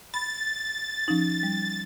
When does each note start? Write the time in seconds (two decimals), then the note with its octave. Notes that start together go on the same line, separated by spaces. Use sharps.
0.14 B5 A6
1.08 F3 C#4 D#4
1.43 G3